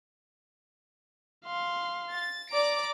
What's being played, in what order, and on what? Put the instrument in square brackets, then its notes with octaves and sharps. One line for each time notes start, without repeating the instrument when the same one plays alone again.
[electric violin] F5 C6
[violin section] A6
[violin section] D5 D6 D7 [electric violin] A#5